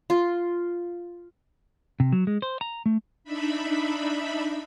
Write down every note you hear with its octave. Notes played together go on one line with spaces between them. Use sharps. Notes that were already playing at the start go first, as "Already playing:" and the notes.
F4
C3
F#3
G#3
C5
A#5
A3
D4 D#4 E5 B5